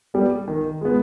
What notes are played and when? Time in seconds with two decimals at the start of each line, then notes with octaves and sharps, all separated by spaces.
0.14 G3 B3
0.48 D#3
0.81 G#3 B3